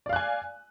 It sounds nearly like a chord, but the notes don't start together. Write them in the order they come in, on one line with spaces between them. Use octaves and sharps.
D5 F5 F#6 G#5